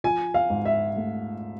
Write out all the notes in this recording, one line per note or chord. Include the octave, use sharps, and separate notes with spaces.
F3 G#5
F5
G#2
E5
A3